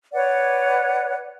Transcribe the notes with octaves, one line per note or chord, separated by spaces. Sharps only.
B4 C#5 D5 F#5